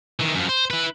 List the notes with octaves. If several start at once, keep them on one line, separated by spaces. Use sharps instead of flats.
D#3 E3
F#2 F3
C5
E4 B4